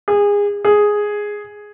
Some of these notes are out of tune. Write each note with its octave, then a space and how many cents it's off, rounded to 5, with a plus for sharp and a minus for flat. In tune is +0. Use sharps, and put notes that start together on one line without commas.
G#4 -25
G#4 +0